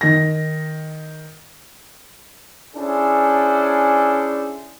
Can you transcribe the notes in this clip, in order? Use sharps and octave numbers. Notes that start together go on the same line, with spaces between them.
D#3 A#6
C#4 D4 E4 G#4 A4 C5